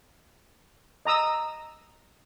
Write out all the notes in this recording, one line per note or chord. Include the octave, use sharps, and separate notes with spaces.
D#5 A#5 D#6 E6